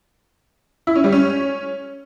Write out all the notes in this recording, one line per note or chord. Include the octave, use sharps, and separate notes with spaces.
E4
C#4
G3
C#4